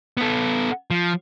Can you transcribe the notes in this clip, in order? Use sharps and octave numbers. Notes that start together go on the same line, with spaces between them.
B3 A4
F3